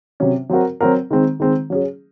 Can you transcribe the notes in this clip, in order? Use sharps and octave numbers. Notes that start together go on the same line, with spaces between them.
C3 F#3 C#4
F#3 C4 F#4 A#4
F#3 C4 F#4 A#4
D#3 G#3 C4
D#3 G#3 C4
F#3 C#4 G#4